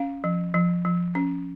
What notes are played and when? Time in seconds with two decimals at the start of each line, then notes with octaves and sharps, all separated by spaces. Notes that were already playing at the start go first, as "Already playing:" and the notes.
Already playing: C#4 F5
0.24 F3
0.54 F3
0.85 F3
1.15 C#4